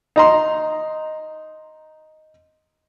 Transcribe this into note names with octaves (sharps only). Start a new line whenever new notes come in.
D#4 A#5 C6